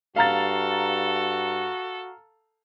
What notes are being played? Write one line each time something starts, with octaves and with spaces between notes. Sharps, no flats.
G2 F#4 A4 F5 A#5 A6